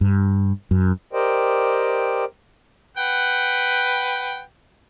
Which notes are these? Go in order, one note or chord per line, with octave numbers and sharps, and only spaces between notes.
G2
F#2
G4 A#4 C5 D5 D#5 G5
B4 F#5 G5